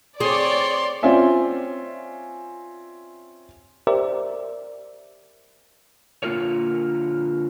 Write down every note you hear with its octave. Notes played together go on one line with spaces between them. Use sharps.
C4 G#4 C#5 D5 C6
C4 C#4 F4 D5 E5 G#5
G4 A#4 C5 D5 E5
D3 A#3 F4 A#4 C#5